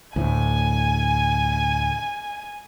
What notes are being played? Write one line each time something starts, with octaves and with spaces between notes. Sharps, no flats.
D2 A2 G#5